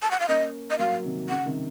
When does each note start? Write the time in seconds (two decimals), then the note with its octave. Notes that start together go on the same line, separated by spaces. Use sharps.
0.02 A5
0.11 F#5
0.20 F5
0.28 A#3 C#4 D#5
0.71 D#5
0.78 F#3 A#3 F5
1.05 C3 D#3
1.29 C#3 F#5
1.46 C3 D#3